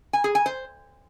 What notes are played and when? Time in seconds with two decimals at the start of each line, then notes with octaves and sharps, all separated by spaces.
0.13 G#5
0.24 G#4
0.35 G#5
0.46 C5